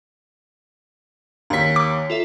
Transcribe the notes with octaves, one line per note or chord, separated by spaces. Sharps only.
D#2 C#5 A#5 B6
D6
F4 A4 E5